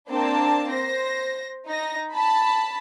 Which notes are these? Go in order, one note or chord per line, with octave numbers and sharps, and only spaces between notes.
A#3 C4 D4 A5
C5 A#6
D#4 A#6
A5 B5